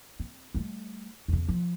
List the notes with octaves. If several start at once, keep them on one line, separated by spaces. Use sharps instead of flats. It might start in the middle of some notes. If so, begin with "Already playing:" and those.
C4
G3 A3
E2 C#3
F3